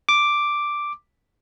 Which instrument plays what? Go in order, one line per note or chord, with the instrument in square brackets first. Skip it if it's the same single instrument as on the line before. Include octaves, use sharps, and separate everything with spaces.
[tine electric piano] D6